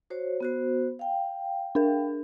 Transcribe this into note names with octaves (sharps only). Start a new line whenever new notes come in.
F#4 C5 C#5
B3 F#4 C5
F5 G5
D4 A#4